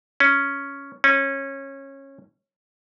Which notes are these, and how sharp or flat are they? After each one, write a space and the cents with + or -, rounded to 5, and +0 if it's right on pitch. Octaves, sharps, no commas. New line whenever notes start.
C#4 +5
C#4 -20